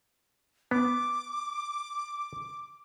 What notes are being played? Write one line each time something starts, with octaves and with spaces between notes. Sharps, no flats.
B3 D6